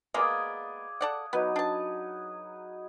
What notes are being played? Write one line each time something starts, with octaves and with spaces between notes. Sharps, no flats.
G#3 A#3 B3 G#4 D5 F5
A4 D5 F#5
F#3 B3 D#4 B4
D4 A5